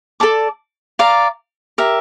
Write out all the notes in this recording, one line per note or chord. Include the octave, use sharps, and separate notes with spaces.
A4 D5 A5 D6
D5 F5 A#5
G4 A#4 E5